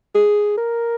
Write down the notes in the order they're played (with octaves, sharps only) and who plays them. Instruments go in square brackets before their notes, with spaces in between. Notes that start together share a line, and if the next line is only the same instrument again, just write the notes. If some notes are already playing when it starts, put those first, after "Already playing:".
[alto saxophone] G#4
A#4